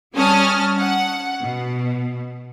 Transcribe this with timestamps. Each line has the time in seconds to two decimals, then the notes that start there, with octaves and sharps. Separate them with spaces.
0.15 G3 C#4 G#5 A5 D#6 F6
0.78 F#5
1.42 B2